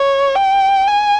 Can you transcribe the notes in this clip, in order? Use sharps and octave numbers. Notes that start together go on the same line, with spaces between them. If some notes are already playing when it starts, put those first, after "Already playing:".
Already playing: C#5
G5
G#5